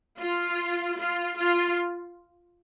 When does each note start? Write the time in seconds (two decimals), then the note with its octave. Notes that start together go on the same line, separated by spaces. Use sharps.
0.22 F4
0.99 F4
1.38 F4